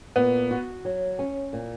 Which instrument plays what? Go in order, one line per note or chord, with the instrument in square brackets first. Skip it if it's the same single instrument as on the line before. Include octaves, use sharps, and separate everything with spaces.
[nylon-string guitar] A#2 [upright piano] B3
[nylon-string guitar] F#4
F#3
C#4
A#2